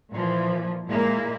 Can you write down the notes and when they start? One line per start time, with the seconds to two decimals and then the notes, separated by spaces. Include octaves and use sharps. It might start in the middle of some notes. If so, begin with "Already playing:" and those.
0.11 A#2 E3 F3
0.88 A#2 G#3 A#3 E4